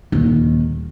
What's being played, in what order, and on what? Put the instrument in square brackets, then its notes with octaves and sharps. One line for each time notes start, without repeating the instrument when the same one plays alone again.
[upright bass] D#1 D#3